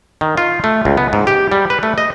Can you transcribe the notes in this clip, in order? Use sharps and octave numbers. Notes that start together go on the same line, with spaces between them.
D#3
F4
A3
C#2
B3
G#2
G4
G3
B4
A3
D#5